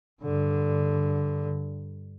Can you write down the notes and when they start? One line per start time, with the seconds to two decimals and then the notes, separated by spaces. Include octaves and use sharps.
0.23 G2 D3